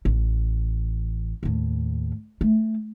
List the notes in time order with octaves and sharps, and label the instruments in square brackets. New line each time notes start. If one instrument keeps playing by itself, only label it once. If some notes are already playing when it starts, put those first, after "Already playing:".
[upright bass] A1
D#2 A2
A3